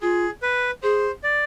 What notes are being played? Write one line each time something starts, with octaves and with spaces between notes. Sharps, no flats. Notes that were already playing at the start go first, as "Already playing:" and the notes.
F4 G#4
B4
G#4 C5
D5